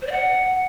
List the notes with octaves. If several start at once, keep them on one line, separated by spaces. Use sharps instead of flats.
C5
D5
F#5